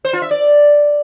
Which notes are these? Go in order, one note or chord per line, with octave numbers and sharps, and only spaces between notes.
C5
F4
E5
D5